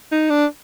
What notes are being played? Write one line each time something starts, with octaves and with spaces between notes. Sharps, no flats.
D#4
D4